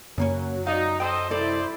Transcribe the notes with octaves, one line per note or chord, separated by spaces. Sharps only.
F#2 C#3 F#3 A#3 C#4
D#4 D5 D#5 F5
A4 C5 D#5 G5
C2 E4 A4 C5 D5